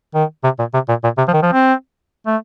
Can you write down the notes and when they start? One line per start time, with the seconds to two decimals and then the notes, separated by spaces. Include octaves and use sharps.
0.15 D#3
0.44 C3
0.59 A#2
0.74 C3
0.88 A#2
1.04 A#2
1.18 C3
1.28 F3
1.33 D#3
1.43 F3
1.53 C4
2.26 A3